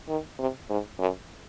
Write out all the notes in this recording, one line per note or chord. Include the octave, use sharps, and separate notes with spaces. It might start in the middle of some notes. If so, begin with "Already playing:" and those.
D#3
C3
G#2
F#2